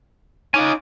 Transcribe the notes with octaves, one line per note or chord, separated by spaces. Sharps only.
C#4 D#4 F4 G#5 D6